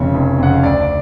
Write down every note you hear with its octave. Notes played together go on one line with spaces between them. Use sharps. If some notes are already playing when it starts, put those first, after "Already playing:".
Already playing: F1 F2 C#3 C#5
F1
F2 C#3 F#5
F5
D2 D5
D5